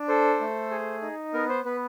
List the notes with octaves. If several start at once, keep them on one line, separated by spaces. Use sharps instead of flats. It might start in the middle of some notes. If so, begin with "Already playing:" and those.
Already playing: D4
A4 C5
A3
G#4
D#4
B3 A#4
C5
B3 B4